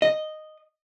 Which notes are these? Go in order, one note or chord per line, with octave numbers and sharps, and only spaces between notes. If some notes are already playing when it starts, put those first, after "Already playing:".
D#5